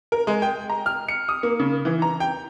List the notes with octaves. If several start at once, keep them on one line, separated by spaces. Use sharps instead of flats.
A#4
G#3
G5
A#5
F6
C#7
D#6
A#3
C#3
E3
A#5
G5